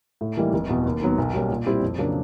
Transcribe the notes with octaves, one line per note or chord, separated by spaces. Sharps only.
A2
E3 G3 A#3 D#4
F1
E2 B2
D#2
D#3 F#3 B3
B1
B2 G3 A#3 C#4
A#2
G3 C4 E4 G4
F2
C#3 F#3 A#3 D4